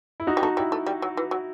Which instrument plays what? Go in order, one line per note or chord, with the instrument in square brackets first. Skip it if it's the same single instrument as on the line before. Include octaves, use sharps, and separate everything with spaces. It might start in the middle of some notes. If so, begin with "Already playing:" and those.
[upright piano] E4
D#4 F#4
[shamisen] G3
[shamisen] A3 [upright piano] D#4 F#4
[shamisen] G3 [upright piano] E4
[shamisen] A3
G3
F#3
E3
F#3